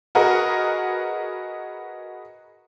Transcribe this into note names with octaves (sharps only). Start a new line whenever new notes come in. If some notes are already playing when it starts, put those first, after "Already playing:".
F#4 G#4 A#4 B4 D#5 F#5